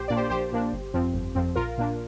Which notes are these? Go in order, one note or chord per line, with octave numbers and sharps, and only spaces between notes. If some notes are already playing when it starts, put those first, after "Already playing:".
Already playing: A#1 G4 C5
A#2 A#3 D4 D5
G4 C5
A#1 G4 C5
A#2 A#3 D4
G1
F2 F3 C4
G1
F2 F3 C4
A#1 F4 A#4
A#2 A#3 D4